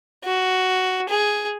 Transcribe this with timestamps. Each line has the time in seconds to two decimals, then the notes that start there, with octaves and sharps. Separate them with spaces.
0.25 F#4
1.09 G#4